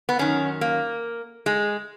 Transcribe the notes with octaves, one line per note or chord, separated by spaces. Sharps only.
B3
F#2 D#3 C#4
A#3
G#3